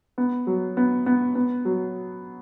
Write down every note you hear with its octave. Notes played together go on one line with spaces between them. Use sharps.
B3
F#3
B3
B3
B3
F#3